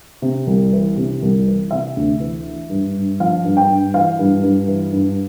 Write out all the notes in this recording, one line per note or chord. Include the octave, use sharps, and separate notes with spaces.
C3
C2
E3
C3
C2
E3
C3 E5
D2
E3
E3
G2
G2
F3 F5
G2
G5
G2
E3 F5
G2
G2
E3
G2